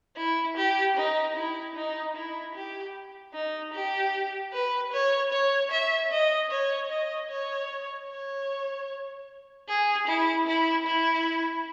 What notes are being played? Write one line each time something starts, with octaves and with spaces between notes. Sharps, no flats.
E4
G4
D#4
E4
D#4
E4
G4
D#4
G4
B4
C#5
C#5
E5
D#5
C#5
D#5
C#5
C#5
G#4
E4
E4
E4